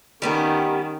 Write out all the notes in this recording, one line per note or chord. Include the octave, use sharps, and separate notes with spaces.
D#3 G3 B3 C#4 G4